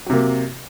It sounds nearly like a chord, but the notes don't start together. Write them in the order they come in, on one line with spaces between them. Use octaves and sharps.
F#3 C3 A#3